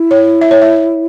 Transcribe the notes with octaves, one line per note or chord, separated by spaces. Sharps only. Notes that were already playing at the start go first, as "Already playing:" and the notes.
Already playing: E4
C#5
E5
C#5
E5